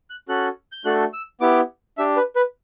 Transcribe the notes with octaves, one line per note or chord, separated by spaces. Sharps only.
F#6
C#4 F#4 A4 F#6
G6
A3 D4 F#4 A4 F#6
E6
B3 E4 G4 D6
D4 G4 E5
B4
B4